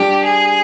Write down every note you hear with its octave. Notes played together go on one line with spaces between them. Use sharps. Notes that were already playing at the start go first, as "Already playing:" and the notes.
Already playing: G3 D4 F4 G4
G#4